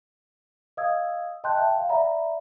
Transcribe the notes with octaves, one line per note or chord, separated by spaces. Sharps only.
D#5 F5 D#6 E6 G#6
D#5 G5 A5 C6 F#6 G6
E5 G5 A5
F5
D5 E5 F#5 A#5 B5